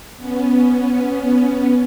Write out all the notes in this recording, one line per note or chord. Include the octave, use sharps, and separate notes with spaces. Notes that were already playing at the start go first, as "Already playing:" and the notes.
B3 C#4